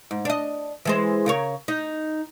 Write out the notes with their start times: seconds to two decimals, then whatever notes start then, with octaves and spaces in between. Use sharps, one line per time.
0.11 G#2
0.25 D4 D#5
0.85 E3 G#3 C5
1.26 C#3 A#4 C#5
1.68 D#4